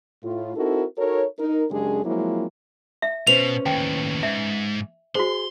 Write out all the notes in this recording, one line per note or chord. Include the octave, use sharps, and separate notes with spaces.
A2 F4
C4 D#4 E4 F#4 A4 A#4
D#4 F#4 A4 A#4 C#5
D#4 A#4
F#2 C#3 G#3 D4 G4 G#4
F3 F#3 G#3 A#3 C4 E4
E5
B2 C#4 B4 C5 F7
D#2 A2 G5
G#2 E5
F#4 G#4 C5 C6